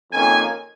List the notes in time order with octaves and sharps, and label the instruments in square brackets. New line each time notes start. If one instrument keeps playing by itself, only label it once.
[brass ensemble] F2 D#3 A#3 C#4 G#5